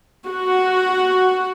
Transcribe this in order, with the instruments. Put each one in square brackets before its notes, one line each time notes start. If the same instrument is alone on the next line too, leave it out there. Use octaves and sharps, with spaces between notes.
[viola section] F#4